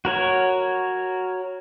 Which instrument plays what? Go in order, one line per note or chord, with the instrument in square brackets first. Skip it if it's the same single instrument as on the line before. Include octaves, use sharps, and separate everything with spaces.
[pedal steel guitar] F#4 A#4 C#5